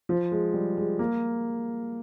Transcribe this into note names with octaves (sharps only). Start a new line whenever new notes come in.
F3
G#3
G3
G#3
A#3